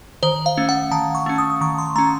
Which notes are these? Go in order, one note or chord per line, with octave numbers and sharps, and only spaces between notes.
D#3 C5
F5
A3 C#4
F#5
D#3 A5
C#6
A3 C#4
D#6
D#6
D#3 C#6
C6
A3 C#4 A#5